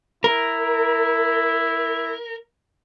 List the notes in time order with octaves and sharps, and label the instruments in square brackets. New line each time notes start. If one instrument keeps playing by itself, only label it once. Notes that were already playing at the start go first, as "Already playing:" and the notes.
[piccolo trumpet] E4 [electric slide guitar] A#4